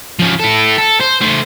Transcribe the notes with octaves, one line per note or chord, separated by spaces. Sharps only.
F3 C#4
E4 A4
A4
C5
A3 C5